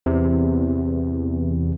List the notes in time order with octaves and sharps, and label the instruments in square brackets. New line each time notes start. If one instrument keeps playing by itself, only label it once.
[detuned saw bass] E2 [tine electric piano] C3